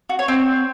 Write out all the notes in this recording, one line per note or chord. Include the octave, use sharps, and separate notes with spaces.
F#4
C#5
C4